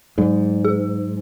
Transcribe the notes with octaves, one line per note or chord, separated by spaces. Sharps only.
G#2 F#3
G#4